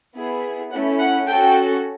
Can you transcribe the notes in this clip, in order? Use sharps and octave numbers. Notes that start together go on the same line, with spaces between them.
B3 E4 G#4
A3 C#4 E4 F#5
F#5
C#4 F#4 A4 G5